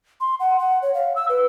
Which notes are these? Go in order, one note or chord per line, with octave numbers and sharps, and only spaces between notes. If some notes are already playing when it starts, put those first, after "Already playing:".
C6
F#5
F#5
C#5
F5
E6
B4